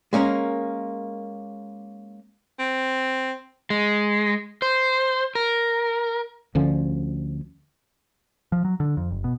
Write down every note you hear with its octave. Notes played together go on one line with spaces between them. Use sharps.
G#3 A#3 C#4 A#4
C4
G#3
C5
A#4
D2 D3 F3 C#4
F3
F#3
D3
F2
F#1
B2